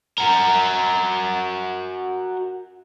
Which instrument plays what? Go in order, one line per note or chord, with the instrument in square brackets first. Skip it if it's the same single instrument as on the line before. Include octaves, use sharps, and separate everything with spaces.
[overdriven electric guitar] F#4 A#4